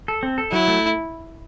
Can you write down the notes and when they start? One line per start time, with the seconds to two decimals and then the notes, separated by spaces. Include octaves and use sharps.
0.08 A4
0.23 C4
0.38 A4
0.52 F#3 E4
0.68 A3